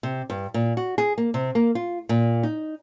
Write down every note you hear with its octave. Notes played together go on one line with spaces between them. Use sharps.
C3
G2
A#2
F#4
G#4
A#3
C3
A#3
F4
A#2
D#4